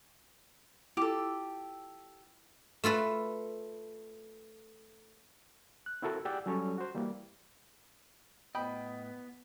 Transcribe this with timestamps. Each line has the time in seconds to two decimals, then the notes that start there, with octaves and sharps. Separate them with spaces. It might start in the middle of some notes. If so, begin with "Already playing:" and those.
0.97 E4 F4 G4 A4
2.84 A3 F4 A4 B4
5.86 F#6
6.02 C4 E4 F#4 A4 A#4
6.25 G4 G#4 D5 F#5 G5 E6
6.46 F#3 G3 C#4 A4 C#5
6.78 F#4 C5
6.95 E3 G3 A#3
8.55 A2 B3 D#5 G5 B5